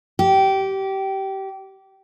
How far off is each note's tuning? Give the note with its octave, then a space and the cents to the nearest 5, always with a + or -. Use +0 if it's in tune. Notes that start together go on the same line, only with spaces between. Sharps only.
G4 -20